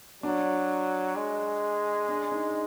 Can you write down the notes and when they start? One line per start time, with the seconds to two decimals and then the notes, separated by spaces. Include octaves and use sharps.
0.23 F#3 D4
1.16 G#3
2.09 D4
2.32 D#4